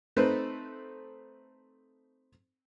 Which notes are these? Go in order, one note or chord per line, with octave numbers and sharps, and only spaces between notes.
A3 C4 D#4 B4 C5